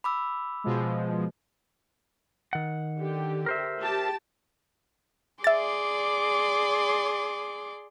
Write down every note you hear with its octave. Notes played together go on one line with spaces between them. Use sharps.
B5 D6 E6
B2 F3 G#3
D#3 F#5
D3 G4
A#4 C5 E5
G4 A5
G#4 D5 E5 C6 D6 A6